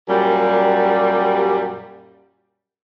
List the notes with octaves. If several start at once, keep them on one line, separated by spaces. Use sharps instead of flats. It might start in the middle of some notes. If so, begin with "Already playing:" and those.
F#2 A#2 G3